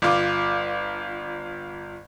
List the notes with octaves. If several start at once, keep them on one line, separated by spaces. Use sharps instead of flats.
G1 F4 D6